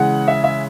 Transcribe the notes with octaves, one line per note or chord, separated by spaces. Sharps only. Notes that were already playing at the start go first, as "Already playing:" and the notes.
Already playing: C#3 E3 G#3 F#5
E5
E5